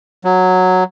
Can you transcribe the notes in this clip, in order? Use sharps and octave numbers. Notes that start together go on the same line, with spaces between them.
F#3